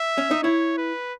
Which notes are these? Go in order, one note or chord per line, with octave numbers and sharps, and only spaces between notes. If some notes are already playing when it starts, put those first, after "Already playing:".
Already playing: E5
C#4
D#4
E4 C#5
B4